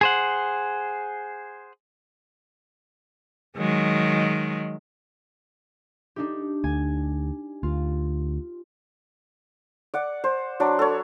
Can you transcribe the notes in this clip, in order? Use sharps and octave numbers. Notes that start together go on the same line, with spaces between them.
G#4 C5 F#5
D#3 F#3 G#3
D4 D#4 G4
D2 G#5
D2 F4
D5 F#5
C5
F#3 D4 D5
A4 C#5